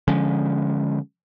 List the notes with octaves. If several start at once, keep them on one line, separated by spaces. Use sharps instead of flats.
D3 F3 G#3 C#4